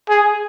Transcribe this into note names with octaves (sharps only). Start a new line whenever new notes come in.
G#4